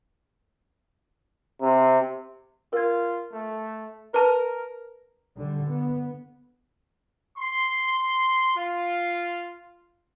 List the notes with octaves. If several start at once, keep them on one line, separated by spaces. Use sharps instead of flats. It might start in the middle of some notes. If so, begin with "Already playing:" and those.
C3
F4 A#4 G#6
A3
A#4 B4 A5
D3 G3
B3
C6
F4